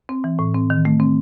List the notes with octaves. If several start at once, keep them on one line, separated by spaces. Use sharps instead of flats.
C4
E3
A2
C4
D#3
A3
C4